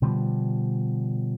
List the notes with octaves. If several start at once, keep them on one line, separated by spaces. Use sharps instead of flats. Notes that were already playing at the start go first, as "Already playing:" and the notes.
B2 D3 F3 G3